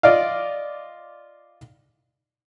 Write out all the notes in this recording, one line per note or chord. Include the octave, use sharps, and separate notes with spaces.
F4 D5 D#5 F5